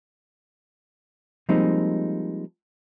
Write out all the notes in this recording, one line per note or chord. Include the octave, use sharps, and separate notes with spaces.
F3 G3 G#3 A#3 C4 D#4